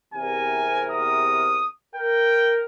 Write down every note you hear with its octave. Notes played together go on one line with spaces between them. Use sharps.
E2 C3 A#4 G#5
D#6
A#4 G5